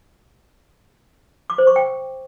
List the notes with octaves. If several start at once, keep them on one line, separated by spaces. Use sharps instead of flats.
D6
C5
C#6
G5